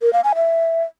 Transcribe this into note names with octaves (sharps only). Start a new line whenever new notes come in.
A#4
F5
G#5
E5